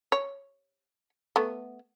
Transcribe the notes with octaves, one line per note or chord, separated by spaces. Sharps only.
C#5
A3 B3